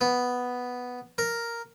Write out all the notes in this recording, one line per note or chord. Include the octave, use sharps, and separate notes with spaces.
B3
A#4